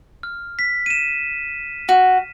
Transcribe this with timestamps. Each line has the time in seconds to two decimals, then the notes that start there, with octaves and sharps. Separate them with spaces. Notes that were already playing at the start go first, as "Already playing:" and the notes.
0.23 F6
0.59 B6
0.86 D#7 E7
1.89 F#4